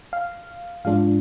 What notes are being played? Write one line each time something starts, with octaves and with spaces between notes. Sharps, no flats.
F5
G#2 F3 G#3 D4 F4 F5